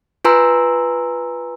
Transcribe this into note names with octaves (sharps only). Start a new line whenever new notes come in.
F4 B4 G#5 A#5 C6 E6